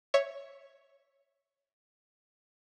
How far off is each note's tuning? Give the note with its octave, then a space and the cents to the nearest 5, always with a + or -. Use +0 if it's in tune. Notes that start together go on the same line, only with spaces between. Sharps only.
C#5 +0 E5 +0